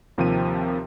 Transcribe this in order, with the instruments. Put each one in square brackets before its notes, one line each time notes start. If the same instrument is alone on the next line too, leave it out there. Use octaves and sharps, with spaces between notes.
[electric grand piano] D#2 C3 F3 A#4 G5 D#7